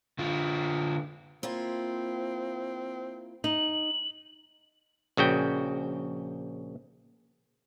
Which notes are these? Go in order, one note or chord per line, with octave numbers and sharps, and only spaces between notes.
D3 F4
A#3 C4 E4 F4
D#4 F#7
A#1 C#3 F#4 G5